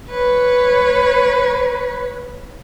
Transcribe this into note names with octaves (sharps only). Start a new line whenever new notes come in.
B4 C#5